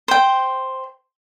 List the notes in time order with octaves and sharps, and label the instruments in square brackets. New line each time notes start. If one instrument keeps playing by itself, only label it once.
[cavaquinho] C5 G5